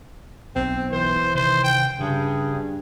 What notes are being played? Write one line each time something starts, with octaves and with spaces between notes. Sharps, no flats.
B1 C4
E3 C5
C3 D#3 C5
G5
G2 C#3 G#4